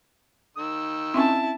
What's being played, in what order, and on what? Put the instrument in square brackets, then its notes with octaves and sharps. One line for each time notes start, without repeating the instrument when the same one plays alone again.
[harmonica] D#3 E6
[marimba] C4 C#4 G#5 [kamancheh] E4 A5